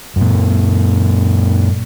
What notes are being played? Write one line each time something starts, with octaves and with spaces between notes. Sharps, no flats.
F#2 A#2